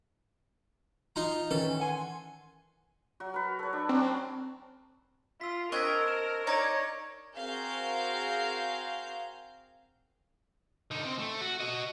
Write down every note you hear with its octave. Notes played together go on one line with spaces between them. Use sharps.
D#4 F4 A#5
D#3 E3 C#4 A4
F#5 G#5 C6
F#3 F#4
A#4 B4
A4 C#5
D4
F#3 C4 C#4
F4 E6 B6
C4 D4 A#4 D#5 C#6 G#6 B6
E7
D#4 C#5 D5 A#5 G#6 A#6
C4 F#4 G#4 A#4 F5 G6
D3 D#4
C4
A3
F#4
F#4 D#5